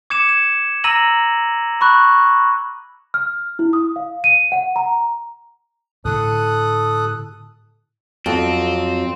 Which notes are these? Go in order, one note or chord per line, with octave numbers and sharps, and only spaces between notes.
D6 G#6 C#7 E7
E7
A#5 E6 A#6 D#7 F#7
B5 C#6 F#6
F6
E4
D#6
F5
D#7
F#5
A#5
A2 D3 A4 D#6 F#6
F2 F#3 C4